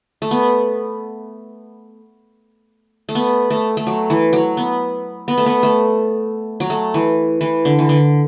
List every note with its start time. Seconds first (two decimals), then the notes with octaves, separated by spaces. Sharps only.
0.22 A3
0.31 B3
3.09 A3
3.15 B3
3.50 A3
3.77 A3
3.87 F#3
4.10 E3
4.33 F#3
4.57 B3
5.28 B3
5.38 A3
5.46 B3
5.63 A3
6.60 F#3
6.70 A3
6.94 E3
7.41 E3
7.65 D3
7.79 E3
7.89 D3